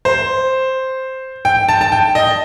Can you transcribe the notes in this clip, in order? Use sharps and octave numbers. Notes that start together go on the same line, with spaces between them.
C5
G5
A5
A5
G5
D#5